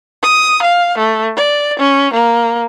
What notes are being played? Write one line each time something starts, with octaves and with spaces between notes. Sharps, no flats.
D#6
F5
A3
D5
C#4
A#3